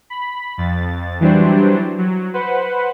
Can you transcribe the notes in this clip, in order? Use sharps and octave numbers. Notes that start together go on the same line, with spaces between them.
B5
F2 A6
E3 F#3 G3 D4 C5
F#3
B4 C5 F#5 B5